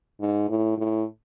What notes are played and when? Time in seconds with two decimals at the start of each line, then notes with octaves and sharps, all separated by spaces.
0.20 G#2
0.49 A2
0.78 A2